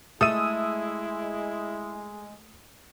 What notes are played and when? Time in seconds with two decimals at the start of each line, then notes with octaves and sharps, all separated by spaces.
0.21 G#3 A3 E4 A4 D#6 E6 D#7